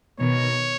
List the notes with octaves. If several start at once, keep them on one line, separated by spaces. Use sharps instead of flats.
B2 D#3 C#5